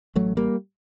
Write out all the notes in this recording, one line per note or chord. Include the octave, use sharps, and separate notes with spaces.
A1 F#3 A3
G3 A#3